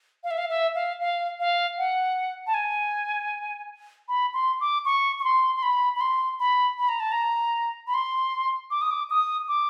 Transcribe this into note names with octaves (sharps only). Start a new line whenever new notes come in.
F5
E5
F5
E5
F5
F5
F5
F#5
A5
G#5
B5
C6
D6
C#6
C#6
C6
C6
B5
B5
C6
B5
B5
A#5
A5
A#5
B5
C6
D6
D#6
D6
D#6
D6